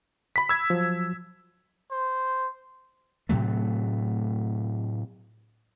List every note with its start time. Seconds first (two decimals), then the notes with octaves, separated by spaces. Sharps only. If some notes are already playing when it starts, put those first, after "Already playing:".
0.36 B5 B6
0.49 B5 E6 G#6
0.70 F3 F#3
1.91 C5
3.29 A2 C3 F#3 A3